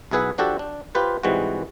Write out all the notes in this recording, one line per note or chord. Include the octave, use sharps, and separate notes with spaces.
B1 E4 G#4 B4 E5 F#5
F3 D4 F#4 G4 A4
D4
F4 G4 B4 C5
G#2 C3 E3 G3 G#3 F#4